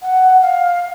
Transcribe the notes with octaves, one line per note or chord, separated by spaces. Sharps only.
F#5
F5